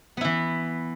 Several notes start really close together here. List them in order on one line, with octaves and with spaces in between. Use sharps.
B3 E4 E3